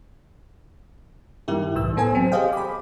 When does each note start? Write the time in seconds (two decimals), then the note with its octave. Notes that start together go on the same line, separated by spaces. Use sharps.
1.48 G2 D#3 E4 G4
1.75 C2 A2 E3 E6
1.96 A2 B3 A4 C5 G#5
2.15 F#3 C4
2.32 G4 G#4 C5 D#5 F5 G5
2.53 B5 D6